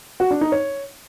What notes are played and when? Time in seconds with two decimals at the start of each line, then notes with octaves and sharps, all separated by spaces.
0.20 F#4
0.31 D4
0.41 D#4
0.52 C#5